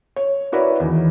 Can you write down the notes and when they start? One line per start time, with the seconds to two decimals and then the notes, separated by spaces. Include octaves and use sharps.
0.16 C#5
0.52 E4 F#4 A#4 B4 C#5 D5
0.80 E2 D#3